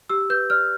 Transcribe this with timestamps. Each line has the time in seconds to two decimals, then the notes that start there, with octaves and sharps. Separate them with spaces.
0.09 G4 E6
0.30 B4 G6
0.50 D5 F6